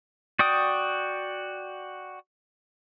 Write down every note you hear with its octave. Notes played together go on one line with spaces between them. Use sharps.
F#4 D5 G5 D#6